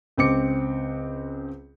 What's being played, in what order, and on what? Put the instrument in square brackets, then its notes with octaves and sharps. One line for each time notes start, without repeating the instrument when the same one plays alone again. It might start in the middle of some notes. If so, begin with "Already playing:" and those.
[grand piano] C#2 C4 D6 C#7